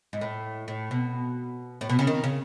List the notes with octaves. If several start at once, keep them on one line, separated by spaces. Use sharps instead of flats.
G#2
A2
A2
B2
A2
B2
C#3
D#3
C#3